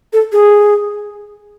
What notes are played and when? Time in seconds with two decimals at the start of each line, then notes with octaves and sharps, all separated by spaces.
0.13 A4
0.32 G#4